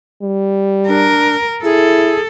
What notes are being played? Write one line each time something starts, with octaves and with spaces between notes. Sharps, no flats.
G3
D4 A#4
E4 G#4 A4